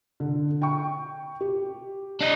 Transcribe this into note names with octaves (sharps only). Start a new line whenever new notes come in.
D3
G5 C#6
G4
D4 D#5